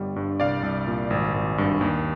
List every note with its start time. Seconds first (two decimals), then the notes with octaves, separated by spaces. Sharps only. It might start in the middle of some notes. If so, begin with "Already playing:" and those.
Already playing: G1 G3
0.16 G2
0.40 C2 D5 F5
0.63 C2
0.87 A#2
1.10 G#1
1.34 G#1
1.58 G2
1.81 D#2